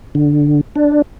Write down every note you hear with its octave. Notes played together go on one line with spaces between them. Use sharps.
D3
D4